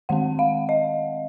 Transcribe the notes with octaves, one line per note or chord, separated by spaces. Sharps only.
D#3 G#3 C4 F#5
F5
D#5